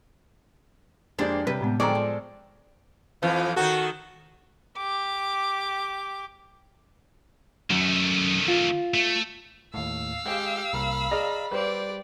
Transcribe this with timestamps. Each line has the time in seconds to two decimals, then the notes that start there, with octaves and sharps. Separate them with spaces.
1.19 F2 G#3 A#3 D4 G4 C5 D5
1.47 C3 G3 B4
1.61 A2 G#3 B3
1.80 D3 F3 G#3 C4 A4 D5 A#5 C#6
1.95 F3
3.22 F2 E3 F3
3.56 D#3 D#4 F#4 A4
4.77 G4 D6
7.70 F#2 D#3 A3
8.48 F4
8.94 A3
9.74 D#2 A2 F5 E6
10.26 G#3 G4 G#4
10.73 C2 A#3 A#4 B5
11.11 G#4 D5 D#5 A#5 F6
11.51 G3 G4 B4 C5 D5